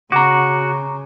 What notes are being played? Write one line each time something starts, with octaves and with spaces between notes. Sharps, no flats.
C#3 C#4 F#4 A#5 D6